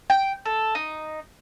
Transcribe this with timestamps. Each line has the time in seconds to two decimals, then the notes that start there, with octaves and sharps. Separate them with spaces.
0.10 G5
0.46 A4
0.75 D#4